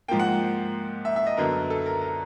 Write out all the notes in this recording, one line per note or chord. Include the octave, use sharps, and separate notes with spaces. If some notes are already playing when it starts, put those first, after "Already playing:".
G#2 F3 A#3 G5
F#5
E5
E5
D#5
F#2 D3 F#3 B3 A#4
A4
A#4
A#4